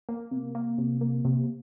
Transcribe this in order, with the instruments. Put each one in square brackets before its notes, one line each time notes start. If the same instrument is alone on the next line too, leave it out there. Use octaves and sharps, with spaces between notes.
[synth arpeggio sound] A#3
C3
A#3
C3
A#3
C3